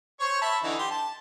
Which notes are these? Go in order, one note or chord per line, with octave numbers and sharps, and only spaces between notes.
C5 C#5 C#6
E5 A5 B5
D3 E3 D#4
G4 C6
A5